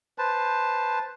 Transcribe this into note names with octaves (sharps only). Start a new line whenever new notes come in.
B4 C5 A5